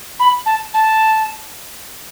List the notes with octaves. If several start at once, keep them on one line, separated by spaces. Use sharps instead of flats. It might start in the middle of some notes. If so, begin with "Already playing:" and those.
B5
A5
A5